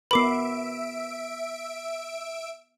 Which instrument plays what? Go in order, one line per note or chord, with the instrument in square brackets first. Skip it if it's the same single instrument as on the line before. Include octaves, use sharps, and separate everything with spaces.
[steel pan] B3 A#4 B4 [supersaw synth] E5 D7 [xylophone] B5 D6 C7